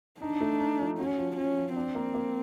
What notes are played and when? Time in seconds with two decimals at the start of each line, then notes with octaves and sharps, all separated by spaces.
0.21 D4 D#4
0.41 A3
0.59 D#4
0.80 F3
0.99 C#4 F#4
1.18 F3
1.37 F3 C#4
1.57 F3
1.76 C4 D4
1.95 A#3
2.14 A#3